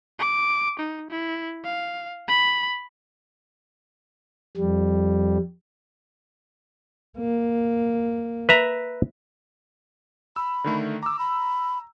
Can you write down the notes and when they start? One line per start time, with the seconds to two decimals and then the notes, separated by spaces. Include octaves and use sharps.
0.19 D6
0.80 D#4
1.11 E4
1.64 F5
2.28 B5
4.57 F2 G3
7.18 A#3
8.49 B4 E5 A#5
10.36 B5 E6
10.64 D3 D#3 A3
11.03 A#5 D6 E6
11.19 B5